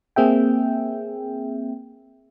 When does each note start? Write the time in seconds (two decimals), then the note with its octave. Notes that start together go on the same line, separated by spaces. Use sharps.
0.16 A#3 C4 G#4 E5 G5